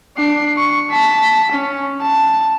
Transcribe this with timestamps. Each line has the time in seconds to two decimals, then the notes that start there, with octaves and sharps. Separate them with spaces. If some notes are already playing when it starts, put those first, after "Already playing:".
0.16 D4 C7
0.57 C#6
0.90 A5 B6
1.52 C#4
2.02 A5